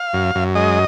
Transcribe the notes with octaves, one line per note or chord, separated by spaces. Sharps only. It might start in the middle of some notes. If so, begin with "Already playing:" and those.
Already playing: F5
F#2
F#2
G#3 D#5